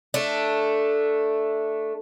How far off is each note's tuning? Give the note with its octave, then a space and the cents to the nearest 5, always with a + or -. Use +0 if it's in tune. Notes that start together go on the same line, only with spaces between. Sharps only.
A3 +0 D4 +0